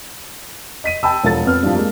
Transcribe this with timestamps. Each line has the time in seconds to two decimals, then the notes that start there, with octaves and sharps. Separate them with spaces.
0.84 D#5 B6 D#7
1.03 G5 A5 B5 E6
1.23 E1 F3 A4 A6
1.45 F2 B3 F6
1.63 G2 F3
1.75 G#3 A#3